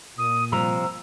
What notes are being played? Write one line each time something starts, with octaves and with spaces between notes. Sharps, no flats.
A#2 D#6
C3 F3 G3 A#5 E6